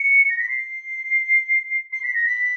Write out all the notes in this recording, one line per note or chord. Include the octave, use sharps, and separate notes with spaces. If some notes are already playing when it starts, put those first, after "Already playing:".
Already playing: C#7
A#6
B6
C7
C7
B6
A#6
B6